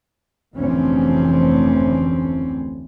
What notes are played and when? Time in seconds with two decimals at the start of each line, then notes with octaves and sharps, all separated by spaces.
0.55 F1 D2 D3 E3 C4 C#4